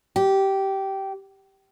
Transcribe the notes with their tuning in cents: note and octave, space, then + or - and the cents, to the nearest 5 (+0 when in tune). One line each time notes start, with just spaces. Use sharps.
G4 -15